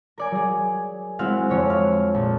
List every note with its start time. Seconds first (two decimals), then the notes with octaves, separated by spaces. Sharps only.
0.18 A#4 D5 G#5
0.31 F#3 G#4
1.19 G#3 C4 E4 F#4 F5 F#5
1.49 F2 D3 C#5
1.70 F5
2.14 A#1